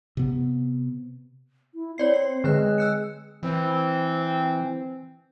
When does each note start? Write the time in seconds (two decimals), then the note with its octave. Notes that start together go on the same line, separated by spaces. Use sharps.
0.17 C3 B3
1.74 E4
1.98 C4 C#5 D5 C7
2.14 C7
2.44 D3 G#3 B4 F#6
2.78 E6 F#6 C#7
3.43 E3 C4